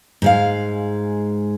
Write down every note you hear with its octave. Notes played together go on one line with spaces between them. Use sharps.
G#2 G#3 F5